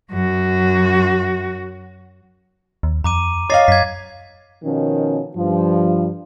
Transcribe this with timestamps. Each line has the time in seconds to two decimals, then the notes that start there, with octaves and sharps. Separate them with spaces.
0.11 F#2 F#4
2.83 D#2
3.04 F2 A#5 D6 D#7
3.50 C#5 D#5 F5 D6 A6 C7
3.68 F#2 G#6 B6
4.64 B2 D#3 F3 C#4
5.36 G2 F3